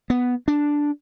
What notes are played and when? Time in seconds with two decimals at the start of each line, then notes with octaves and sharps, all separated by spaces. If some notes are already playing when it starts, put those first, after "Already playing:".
0.10 B3
0.48 D4